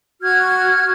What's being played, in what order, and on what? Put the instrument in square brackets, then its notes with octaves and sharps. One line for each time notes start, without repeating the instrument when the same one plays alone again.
[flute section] F#4 F6 G#6